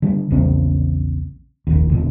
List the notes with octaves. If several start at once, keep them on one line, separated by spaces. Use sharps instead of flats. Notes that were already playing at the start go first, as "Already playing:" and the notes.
D3 G3
A#1 E2 C#3 C4
F1 A#1 D#2
E1 A#1 A#2 D3